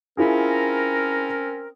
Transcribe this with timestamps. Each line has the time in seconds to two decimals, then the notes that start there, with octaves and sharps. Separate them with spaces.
0.17 C4 C#4 E4 F4 G#4 A#4